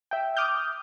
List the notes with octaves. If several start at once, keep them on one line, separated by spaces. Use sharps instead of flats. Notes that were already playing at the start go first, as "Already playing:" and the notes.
E5 G5
D6 D#6 F6 G6